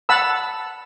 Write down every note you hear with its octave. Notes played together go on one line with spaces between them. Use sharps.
F#5 A5 B5 E6